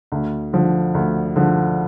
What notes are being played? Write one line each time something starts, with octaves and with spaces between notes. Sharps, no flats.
D2
D3 F3
D2
D3 F3